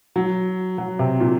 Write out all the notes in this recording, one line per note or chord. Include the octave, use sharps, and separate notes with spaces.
F#3
F#3
C3
A#2